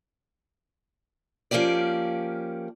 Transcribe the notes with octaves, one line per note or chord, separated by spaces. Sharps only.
F3 A#3 C#4 G4 D5